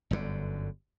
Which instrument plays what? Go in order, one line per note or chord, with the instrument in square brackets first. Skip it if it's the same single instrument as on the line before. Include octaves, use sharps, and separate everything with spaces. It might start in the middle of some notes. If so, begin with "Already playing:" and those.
[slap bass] G1 F#2 A2 D3